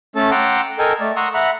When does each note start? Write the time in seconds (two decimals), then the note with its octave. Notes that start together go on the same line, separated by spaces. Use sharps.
0.16 A3 C#4 A4 A5
0.31 F#5 G5 A#5 C6 D6 E6
0.79 A4 A#4 D#5 G5 G#5
1.01 A3 D5
1.16 F#5 A#5 C6 C#6 D#6 E6
1.34 E5 F#5 A#5 B5